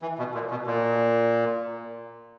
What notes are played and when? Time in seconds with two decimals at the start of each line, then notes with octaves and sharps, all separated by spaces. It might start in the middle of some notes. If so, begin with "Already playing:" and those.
0.02 E3
0.18 B2
0.34 A#2
0.51 B2
0.67 A#2